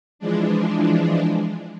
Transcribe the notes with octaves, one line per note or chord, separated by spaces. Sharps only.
E3 F3 G#3 D4